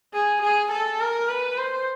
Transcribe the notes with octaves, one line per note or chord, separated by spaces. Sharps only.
G#4
G#4
A4
A#4
B4
C5